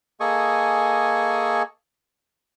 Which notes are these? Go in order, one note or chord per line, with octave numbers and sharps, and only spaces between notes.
A#3 G#4 A4 D#5 G#5 C#6